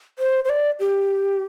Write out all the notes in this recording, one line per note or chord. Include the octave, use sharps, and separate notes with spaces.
C5
C5
D5
G4